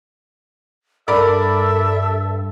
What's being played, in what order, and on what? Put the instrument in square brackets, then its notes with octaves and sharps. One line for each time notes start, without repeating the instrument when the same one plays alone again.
[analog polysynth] G2 [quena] A4 [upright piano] A#4 D5 B5 [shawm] E5